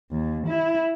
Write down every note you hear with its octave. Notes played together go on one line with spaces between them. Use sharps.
D#2
E4